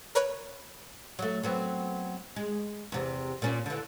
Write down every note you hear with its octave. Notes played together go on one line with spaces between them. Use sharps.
A#4 B4 C#5 B5 F#6
F#3 A3
F#3 B3 C4
G#3
E2 C3
A#2 C#4
D3 E3